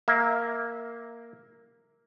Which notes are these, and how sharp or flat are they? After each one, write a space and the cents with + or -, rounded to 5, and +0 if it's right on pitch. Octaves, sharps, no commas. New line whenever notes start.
A#3 +0 E5 -15